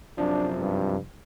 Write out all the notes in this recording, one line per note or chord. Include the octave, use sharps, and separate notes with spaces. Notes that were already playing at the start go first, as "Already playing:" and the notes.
F#2 C3 F3 D4
G2